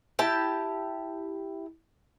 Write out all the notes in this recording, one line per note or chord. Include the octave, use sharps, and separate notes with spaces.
E4 G4 A5